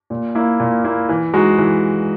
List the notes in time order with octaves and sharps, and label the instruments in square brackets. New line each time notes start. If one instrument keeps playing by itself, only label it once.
[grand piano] A#2
A#3 E4
A#2
A#3 E4
E3
G#3 D#4 F#4
E3